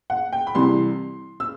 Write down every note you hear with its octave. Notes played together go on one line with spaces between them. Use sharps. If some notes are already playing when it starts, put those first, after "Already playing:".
F#5
G5
B5
C2 C3 E3 G3 C6
E6